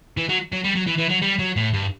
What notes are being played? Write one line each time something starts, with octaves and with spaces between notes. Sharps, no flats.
E3
F#3
F#3
G3
F#3
E3
E3
F#3
G3
F#3
A2
G2